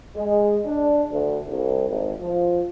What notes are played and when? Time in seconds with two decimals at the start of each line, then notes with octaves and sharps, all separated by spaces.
0.16 G#3
0.65 D4
1.11 D2
1.49 C2
1.89 G#1
2.21 F3